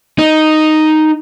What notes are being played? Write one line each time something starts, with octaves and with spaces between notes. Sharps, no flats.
D#4